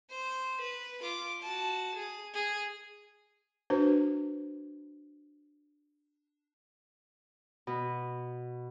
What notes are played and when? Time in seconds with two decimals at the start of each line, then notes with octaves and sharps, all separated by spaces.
0.11 C5
0.62 B4
1.03 F4 D6
1.42 F#4 A5
1.96 G#4
2.34 G#4
3.70 D4 F#4 B4 C5
7.67 B2